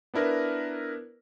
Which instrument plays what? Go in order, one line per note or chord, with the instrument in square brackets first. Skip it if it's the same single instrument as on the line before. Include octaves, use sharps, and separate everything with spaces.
[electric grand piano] B3 D4 E4 A#4 B4